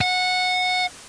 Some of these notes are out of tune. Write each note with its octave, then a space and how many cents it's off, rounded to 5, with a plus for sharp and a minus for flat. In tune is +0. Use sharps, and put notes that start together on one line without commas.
F#5 -15